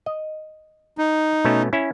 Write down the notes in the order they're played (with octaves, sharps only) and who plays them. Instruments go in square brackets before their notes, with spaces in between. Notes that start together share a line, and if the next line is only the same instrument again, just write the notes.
[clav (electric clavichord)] D#5
[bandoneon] D#4
[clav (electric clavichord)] B2 A3 C#4
C#4 E4